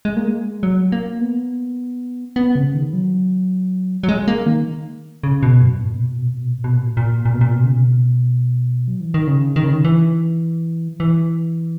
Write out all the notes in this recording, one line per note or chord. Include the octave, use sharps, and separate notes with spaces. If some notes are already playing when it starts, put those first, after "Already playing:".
G#3
A#3
G#3
F#3
A#3
B3
B3
C#3
D#3
F#3
F#3
G#3
A#3
D#3
C#3
B2
F#2
A#2
B2
A#2
B2
A#2
B2
A#2
B2
A#2
A#2
A#2
B2
A#2
B2
C#3
B2
F#3
E3
D#3
C#3
D#3
C#3
D#3
E3
E3